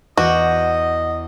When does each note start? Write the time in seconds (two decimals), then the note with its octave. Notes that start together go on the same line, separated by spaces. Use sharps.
0.18 E2 F#4 D#5 D6 G6